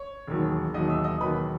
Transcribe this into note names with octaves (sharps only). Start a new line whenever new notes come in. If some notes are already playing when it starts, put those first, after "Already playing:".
Already playing: C#5 C#6
E1 D#2 D#3 F#3
E1 D#2 D#3 F#3 D#5 D#6
E5 E6
D#5 D#6
E1 D#2 D#3 F#3 B4 B5